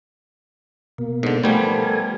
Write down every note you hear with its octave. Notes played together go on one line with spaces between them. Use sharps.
B2 A#3
G#2 D3
F3 G3 A3 B3 A4 A#4 G#5